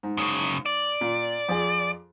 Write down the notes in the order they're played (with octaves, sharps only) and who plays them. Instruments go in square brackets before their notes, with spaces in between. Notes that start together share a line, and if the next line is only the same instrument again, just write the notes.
[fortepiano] G#2
[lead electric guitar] F#2 C#3
D5
[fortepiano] A#2
F2 G#4